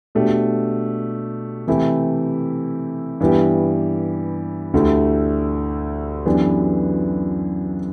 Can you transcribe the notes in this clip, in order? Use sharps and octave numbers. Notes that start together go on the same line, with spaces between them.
B2 A3 D4 G4
C3 E3 A3 E4 G4
G2 E3 B3 E4 G4
D2 D3 A3 E4 G4
F#2 E3 B3 D4 G4